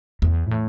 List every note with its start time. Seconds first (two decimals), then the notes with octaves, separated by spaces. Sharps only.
0.22 E2
0.51 A2